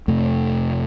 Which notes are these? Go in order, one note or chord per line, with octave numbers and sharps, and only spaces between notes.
F2 C3 A3